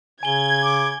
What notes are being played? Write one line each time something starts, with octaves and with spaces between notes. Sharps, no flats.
C#3 G#5 G#6 G7
D6